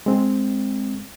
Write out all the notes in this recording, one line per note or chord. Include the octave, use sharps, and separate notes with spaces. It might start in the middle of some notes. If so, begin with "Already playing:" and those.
G#3 C4